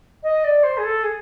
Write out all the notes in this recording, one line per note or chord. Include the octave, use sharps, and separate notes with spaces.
D#5
D5
C5
G#4
A4
G#4